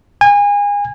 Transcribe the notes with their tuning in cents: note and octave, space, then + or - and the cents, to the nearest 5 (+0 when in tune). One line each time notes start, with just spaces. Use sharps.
G#5 -30